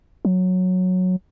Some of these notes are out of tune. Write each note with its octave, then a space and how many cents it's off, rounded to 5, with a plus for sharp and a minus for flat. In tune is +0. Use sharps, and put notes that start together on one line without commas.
F#3 -10